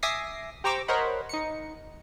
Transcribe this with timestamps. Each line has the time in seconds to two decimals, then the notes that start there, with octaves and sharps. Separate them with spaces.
0.03 E5 G#5 D6 D#6 A#6 C7
0.64 G4 C5 A#5 C#6 D6 E6
0.88 A#4 C5 C#5 D#5 F#5 B5
1.29 D#4 C#7